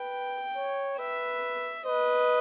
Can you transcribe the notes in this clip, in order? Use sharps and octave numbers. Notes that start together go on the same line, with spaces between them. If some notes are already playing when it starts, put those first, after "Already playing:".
Already playing: B4 G5
C#5
B4 E5
B4 D#5